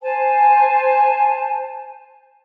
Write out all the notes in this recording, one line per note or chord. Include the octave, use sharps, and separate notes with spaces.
C5 G#5 A5